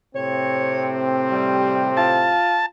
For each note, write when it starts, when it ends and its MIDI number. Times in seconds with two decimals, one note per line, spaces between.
0.16 2.41 45
0.16 2.41 48
0.16 2.41 60
0.16 0.93 73
1.32 1.88 55
1.97 2.65 65
1.97 2.66 81